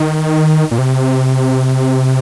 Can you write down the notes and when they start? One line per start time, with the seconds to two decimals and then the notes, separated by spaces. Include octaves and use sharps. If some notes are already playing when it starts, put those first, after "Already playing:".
Already playing: D#3
0.71 A#2
0.78 C3